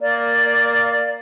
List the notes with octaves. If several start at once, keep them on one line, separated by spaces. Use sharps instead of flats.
A#3 D5